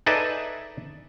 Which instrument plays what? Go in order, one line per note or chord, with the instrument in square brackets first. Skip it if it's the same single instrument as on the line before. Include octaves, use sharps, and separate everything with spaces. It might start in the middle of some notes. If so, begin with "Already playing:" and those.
[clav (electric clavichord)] D#4 G#4 A4 B4 D5 E5